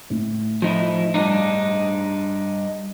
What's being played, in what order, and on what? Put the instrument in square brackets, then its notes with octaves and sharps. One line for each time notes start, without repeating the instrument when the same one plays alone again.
[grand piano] A2
[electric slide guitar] F3 D#4 E4
G2 D4 D#4